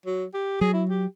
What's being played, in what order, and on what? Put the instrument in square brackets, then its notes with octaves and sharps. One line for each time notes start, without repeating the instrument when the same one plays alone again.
[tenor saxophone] F#3
G4
[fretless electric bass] F#3 [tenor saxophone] G#4
[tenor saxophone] E4
G4